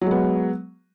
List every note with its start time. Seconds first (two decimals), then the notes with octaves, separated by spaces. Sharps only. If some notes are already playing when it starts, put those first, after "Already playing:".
0.01 F#3
0.06 G#3
0.11 B3